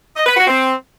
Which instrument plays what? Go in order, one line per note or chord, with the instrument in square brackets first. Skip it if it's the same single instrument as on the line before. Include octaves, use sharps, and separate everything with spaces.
[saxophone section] D#5
B4
F#4
C4